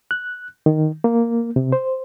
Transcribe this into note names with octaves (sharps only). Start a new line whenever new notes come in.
F#6
D#3
A#3
C3
C5